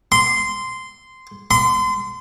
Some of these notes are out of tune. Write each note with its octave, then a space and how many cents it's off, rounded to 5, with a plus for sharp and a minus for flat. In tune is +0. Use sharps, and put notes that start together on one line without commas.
C6 -10
C6 -30